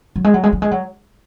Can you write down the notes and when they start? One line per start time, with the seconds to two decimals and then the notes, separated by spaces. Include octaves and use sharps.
0.16 F#3
0.24 G#3
0.34 F#3
0.43 G#3
0.53 F#3
0.62 G#3
0.71 F#3